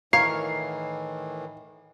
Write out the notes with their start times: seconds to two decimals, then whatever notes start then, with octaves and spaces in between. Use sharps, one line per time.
0.13 A2 D#3 E3 A#4 C#5 F5 C7